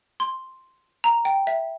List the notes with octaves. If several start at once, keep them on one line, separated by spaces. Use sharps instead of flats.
C6
A#5
G5
E5